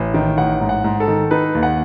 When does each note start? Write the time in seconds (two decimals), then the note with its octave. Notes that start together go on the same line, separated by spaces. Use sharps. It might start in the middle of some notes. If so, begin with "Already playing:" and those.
Already playing: A1
0.14 D#3
0.38 A1 F#5
0.61 G#2
0.69 F#5
0.84 G#2
1.00 A4
1.08 D#3
1.31 D#4 B4
1.55 D#2
1.63 F#5